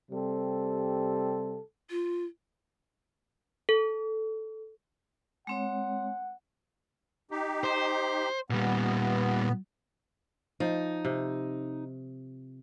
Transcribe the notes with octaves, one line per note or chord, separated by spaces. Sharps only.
C3 G3 C4 A4
F4
A4
G#3 C4 C#5 F#5
D#4 G4
C5
A#2 G3 B3
F3 D#4
C3